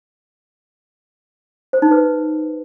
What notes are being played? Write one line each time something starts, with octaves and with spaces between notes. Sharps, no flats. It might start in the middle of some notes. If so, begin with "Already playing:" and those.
C5
D#4
B4